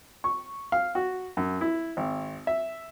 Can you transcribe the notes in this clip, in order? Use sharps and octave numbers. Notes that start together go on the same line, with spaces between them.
C#6
F5
F#4
F#2
E4
G#1
E5